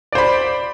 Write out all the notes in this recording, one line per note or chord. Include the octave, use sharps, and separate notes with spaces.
C5 D5 B5